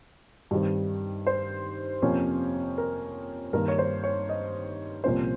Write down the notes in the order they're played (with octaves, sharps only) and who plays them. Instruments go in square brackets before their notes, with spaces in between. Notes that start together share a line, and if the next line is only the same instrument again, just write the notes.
[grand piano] G2 D#3 G3 C4
C5
F2 C3 F3 A#3 C#4
A#4
G2 D#3 A#3 A#4
C#5
C5
C#5
D#5
C2 A#2 F3 A#3 C#4 C5